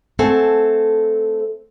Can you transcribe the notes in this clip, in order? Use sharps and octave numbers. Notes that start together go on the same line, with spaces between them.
A3 C4 A4 F#5 G#5